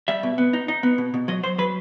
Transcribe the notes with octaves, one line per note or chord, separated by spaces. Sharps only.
G3 E5
B2
B3
D#4
D#4
B3
B2
B2
F#3 D#5
F#3 C5
F#3 B4